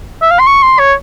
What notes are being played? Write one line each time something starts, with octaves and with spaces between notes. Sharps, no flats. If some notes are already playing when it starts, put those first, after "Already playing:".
E5
F5
C6
C#6
C6
C#5